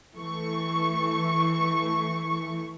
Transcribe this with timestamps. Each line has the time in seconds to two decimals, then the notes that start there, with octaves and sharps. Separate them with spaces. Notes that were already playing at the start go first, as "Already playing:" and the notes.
0.15 E3 A3 C#6